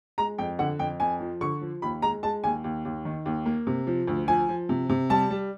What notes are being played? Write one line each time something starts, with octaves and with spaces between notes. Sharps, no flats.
G#3 A#5
F2 G5
D3 F#5
F2 G5
F2 G#5
F3
D3 C#6
F3
D#2 B5
G#3 A#5
G#3 A5
D#2 G#5
D#2
D#2
D#3
D#2
A#3
C3
F3
D2
F3 G#5
F3
C3
C3
G3 A5
G3